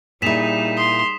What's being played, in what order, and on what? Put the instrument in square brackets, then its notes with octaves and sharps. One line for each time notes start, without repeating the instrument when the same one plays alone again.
[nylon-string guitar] A#2 E4 [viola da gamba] G3 D#4 G#4 [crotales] B6 E7 F7
[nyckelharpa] C6 [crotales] D#6